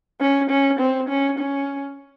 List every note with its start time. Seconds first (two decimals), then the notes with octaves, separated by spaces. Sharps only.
0.20 C#4
0.50 C#4
0.79 C4
1.09 C#4
1.38 C#4